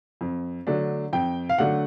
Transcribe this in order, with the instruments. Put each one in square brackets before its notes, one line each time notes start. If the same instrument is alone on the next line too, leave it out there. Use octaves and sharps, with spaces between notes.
[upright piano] F2
D3 F#3 A3 D4
F2 G5
F5
D3 F#3 A3 D4 F#5